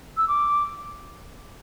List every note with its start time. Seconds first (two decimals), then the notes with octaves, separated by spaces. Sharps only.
0.17 E6
0.27 D6